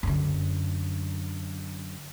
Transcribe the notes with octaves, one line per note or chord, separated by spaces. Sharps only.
F#2 D3